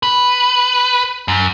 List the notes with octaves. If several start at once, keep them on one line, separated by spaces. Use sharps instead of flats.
B4
F#2